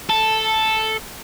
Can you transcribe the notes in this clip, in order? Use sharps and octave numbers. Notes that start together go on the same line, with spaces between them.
A4